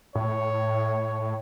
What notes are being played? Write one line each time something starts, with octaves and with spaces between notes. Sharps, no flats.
A2 C#5